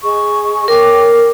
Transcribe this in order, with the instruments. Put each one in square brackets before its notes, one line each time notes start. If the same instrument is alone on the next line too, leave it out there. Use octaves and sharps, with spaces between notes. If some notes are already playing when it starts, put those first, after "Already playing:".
[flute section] G#4 D#5 C#6
[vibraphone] A#4 [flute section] C#5 G5 D6